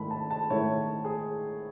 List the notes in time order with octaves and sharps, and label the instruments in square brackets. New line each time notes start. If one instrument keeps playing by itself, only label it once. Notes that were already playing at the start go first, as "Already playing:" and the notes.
Already playing: [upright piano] G#2 D#3 A3 E4 B5
A5
A5
G#2 D#3 A3 E4 C#5
G#4